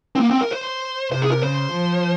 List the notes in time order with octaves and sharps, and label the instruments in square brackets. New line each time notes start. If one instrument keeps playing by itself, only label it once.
[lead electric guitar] C4
A#3
C4
A#4
C5
[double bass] C3 [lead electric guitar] C5
[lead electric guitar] G#4
A#4
[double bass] C#3 [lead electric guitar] C5
[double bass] F3